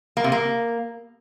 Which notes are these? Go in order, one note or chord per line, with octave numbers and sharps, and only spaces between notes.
A#3
C3
A#3